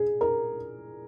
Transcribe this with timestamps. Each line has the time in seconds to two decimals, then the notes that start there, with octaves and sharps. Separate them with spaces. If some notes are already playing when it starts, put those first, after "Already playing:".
Already playing: G#4
0.21 A#4